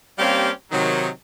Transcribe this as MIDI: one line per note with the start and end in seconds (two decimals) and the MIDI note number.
0.19 0.50 55
0.19 0.50 58
0.19 0.50 60
0.19 0.50 61
0.19 0.50 67
0.19 0.50 77
0.71 1.08 48
0.71 1.08 51
0.71 1.08 54